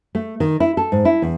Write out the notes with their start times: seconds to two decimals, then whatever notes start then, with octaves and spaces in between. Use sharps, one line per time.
0.15 A3
0.40 D#3
0.60 E4
0.77 A4
0.92 G#2
1.05 E4
1.22 E2